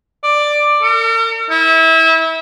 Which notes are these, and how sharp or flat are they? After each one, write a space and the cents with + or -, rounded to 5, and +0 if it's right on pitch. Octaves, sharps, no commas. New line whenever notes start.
D5 +10
A#4 -45
E4 -25